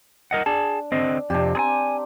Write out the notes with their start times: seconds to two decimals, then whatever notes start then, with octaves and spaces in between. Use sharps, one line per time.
0.31 A#4 D#5 F#5
0.46 D4 G#4 A5
0.92 D3 C4 D#5
1.30 F2 C3 D4 G4
1.55 C4 G#4 G#5 A#5